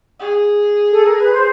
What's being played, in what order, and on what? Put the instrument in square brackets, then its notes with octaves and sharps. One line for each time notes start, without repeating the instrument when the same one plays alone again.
[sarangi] G#4
[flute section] A4
A#4
B4
C5